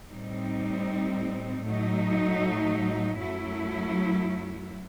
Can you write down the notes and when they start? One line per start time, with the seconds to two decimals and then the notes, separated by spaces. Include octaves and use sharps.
0.10 A2 G3 C4 D#4
1.64 A2 F#3 A3 D#4
3.19 F#2 F#3 A3 E4